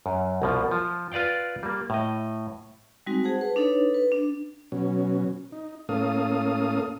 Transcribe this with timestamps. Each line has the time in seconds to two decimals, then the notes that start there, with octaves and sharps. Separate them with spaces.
0.06 F#2
0.42 C2 B2 F3
0.71 F3
1.12 F4 B4 D5 F5 G5
1.63 G3 A#3
1.90 A2 D#5
3.06 G3 G#3 C4 D#4 F#4
3.24 G#4 C5 F#5 A5
3.41 B4
3.56 D4 D#4 A4 B4 C#5
3.94 B4
4.12 D4
4.72 B2 F#3 C#4
5.52 D#4
5.89 A2 A#3 C#4 A4 F5 D#6